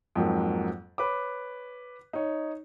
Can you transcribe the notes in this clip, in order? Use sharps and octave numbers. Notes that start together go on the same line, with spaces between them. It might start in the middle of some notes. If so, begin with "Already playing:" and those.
F2 G#2 F#3 A#3
B4 C#5 D6
D#4 C#5